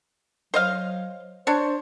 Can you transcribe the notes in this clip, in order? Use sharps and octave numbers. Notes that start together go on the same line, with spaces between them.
F#3 C5 D#5 F5
D4 C5 C#5